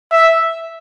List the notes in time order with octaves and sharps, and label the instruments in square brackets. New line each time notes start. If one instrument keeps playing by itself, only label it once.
[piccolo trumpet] E5